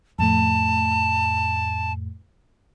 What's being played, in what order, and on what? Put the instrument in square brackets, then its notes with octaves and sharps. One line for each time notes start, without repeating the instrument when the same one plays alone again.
[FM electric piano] F2 A2 A3 [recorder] A5